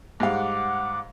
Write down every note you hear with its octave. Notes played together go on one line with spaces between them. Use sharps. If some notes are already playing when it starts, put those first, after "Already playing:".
G#2 G3 F5 F#5 D6